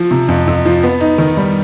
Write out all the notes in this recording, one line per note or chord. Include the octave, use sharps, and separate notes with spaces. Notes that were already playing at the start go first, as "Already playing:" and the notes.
Already playing: F3
C3
F2
F2
F3
B3
D#4
D#3
G3